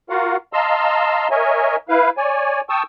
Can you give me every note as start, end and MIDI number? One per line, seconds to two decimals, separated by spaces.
0.10 0.37 65
0.10 0.37 66
0.10 0.37 70
0.10 0.37 77
0.10 0.37 78
0.53 1.28 75
0.53 1.28 77
0.53 1.28 81
0.53 1.28 82
0.53 1.28 84
0.53 1.28 88
1.31 1.76 70
1.31 1.76 73
1.31 1.76 75
1.31 1.76 76
1.31 1.76 80
1.89 2.10 64
1.89 2.10 71
1.89 2.10 77
2.17 2.61 73
2.17 2.61 74
2.17 2.61 80
2.69 2.83 79
2.69 2.83 81
2.69 2.83 85
2.69 2.83 87
2.69 2.83 88